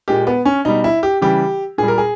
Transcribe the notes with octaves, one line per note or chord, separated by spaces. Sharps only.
A#2 G#3 G4
B3
C#4
B2 G3 D#4
E4
G4
C#3 E3 G3 G4
A#2 G3 G#4
A#4
G#4